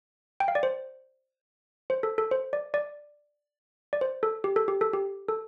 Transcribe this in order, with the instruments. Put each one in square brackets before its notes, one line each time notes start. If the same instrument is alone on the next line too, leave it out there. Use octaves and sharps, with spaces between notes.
[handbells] G5
F5
D5
C5
C5
A4
A4
C5
D5
D5
D5
C5
A4
G4
A4
G4
A4
G4
A4